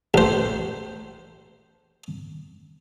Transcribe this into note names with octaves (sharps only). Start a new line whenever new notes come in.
A1 C5